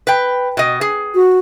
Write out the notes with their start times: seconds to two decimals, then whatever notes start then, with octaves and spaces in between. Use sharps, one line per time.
0.07 B4 G5
0.57 B2 D#5
0.81 G#4
1.15 F#4